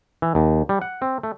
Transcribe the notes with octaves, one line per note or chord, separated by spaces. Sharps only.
E3
D#2
G3
F#5
C4
A3